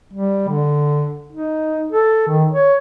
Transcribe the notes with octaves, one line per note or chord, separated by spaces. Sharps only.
G3
D3
D#4
A4
D#3
C#5